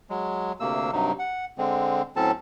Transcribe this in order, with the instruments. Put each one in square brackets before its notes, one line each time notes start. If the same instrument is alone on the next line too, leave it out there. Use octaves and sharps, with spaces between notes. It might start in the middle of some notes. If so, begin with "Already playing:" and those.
[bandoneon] F#3 G#3
D2 C3 A#3 E6
G2 C3 F#3 D#4
F#5
D3 G#3 C4
A2 F#3 C4 C#4 A4 A5